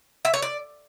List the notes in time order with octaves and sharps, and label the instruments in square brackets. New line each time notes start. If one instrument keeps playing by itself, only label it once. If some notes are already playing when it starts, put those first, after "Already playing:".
[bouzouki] E5
C#5
D5